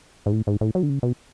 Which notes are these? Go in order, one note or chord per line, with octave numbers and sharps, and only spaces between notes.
G#2
A2
G#2
A2
F#3
D3
C#3
B2